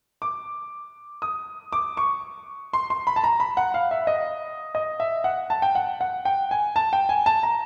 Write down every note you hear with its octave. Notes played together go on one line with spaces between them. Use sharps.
D6
D#6
D6
C#6
C6
C6
B5
A5
A#5
B5
F#5
F5
E5
D#5
D#5
E5
F#5
A5
G5
F#5
F#5
G5
G#5
A5
G5
G#5
A5
A#5